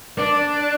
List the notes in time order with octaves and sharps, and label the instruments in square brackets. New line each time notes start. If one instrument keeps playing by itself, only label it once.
[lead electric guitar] D4 [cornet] D5